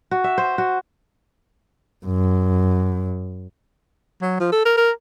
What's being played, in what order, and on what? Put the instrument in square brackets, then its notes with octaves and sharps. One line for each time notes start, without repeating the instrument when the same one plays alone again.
[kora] F#4
E5
C5
F#4
[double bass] F#2
[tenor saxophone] F#3
F3
A4
A#4
A#4